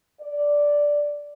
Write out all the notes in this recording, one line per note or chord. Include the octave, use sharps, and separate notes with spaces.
D5